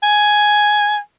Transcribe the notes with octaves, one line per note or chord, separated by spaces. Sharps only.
G#5